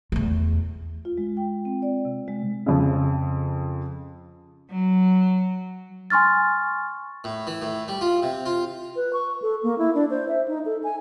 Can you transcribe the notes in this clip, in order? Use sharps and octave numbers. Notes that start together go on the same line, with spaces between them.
E2 A3
F4
G#3
G5
C4
D5
C3
G#3
F2 C#3
F#3
G#5 C6 C#6 F6 A6
A2
E3
A2
G3
F4
C3
F4
B4
C#6
A4
A#3
E4
D4
C5
E5
D#4
A4
G#5